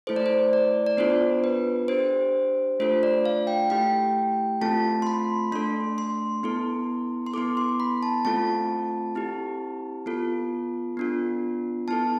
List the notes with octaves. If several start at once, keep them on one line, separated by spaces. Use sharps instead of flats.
A3 E4 A4 C5
D5
C5
D5
D5
B3 D4 F4 A4 C5
B4
D4 G4 C5
A3 D4 F4 A4 C5
D5
F5
G5
A3 E4 G4 G5
A3 C4 F4 A4 A5
C6
B5
A3 D4 A4 C6
C6
B3 E4 A4
C6
B3 E4 A4 D6
C6
B5
A5
A3 C4 F4 A4 A5
C4 E4 G4
B3 F4 A4
B3 D4 F4
B3 E4 A4 A5